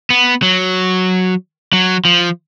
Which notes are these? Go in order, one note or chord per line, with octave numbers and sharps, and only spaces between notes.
B3
F#3
F#3
F3